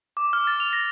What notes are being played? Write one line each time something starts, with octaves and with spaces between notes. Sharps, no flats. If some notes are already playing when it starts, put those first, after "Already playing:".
D6
F6
A6
F7
A#6